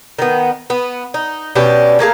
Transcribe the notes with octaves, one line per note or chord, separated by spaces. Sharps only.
D#3 B3
B3
D#4
B2 C#4 D4 G4
A3 A#3 G#4 F5